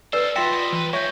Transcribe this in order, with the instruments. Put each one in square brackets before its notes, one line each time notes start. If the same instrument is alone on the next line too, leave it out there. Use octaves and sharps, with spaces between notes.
[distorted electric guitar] A4 C5 [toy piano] B4 E6 [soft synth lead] D5
[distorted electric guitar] F#3 [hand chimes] F4 C6 A6 [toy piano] E5 G5 [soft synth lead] B6
[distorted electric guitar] G3 D#5
[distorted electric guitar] C2 B4 [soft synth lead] E3
[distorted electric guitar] G#3 B5 [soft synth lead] C#5 [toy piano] E5 [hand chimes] C#6 G6